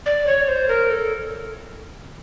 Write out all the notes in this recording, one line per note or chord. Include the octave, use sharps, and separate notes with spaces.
D5
C#5
C5
A#4
A4